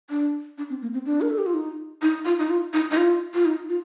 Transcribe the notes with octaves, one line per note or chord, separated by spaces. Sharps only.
D4
D4
C4
A#3
C4
D4
A#4
A4
G4
F4
D#4
D#4
F4
D#4
F4
D#4
D#4
F4
F4
D#4
F4